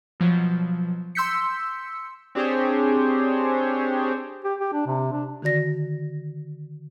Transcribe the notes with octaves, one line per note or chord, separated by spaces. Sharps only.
B2 F3 F#3
C6 E6 G6 B6 C#7
C4 D4 G4 G#4 C5 C#5
G4
G4
D4
C3
D4
D3 D#3 F#4 D5 A#6